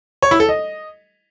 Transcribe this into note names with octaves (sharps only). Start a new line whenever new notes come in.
C#5
E4
A4
D#5